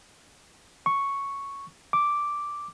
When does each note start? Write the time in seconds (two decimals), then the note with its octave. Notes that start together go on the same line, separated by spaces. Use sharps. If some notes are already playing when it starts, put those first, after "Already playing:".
0.86 C#6
1.93 D6